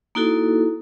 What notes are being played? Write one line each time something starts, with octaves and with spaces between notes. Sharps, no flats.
A#3 D#4 E4 F#4 A4